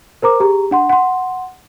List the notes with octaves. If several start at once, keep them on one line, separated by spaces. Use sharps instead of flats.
A#4 C5 A#5 D6
G4 G#4 A#5
D4 F#5 C6
F#5 C6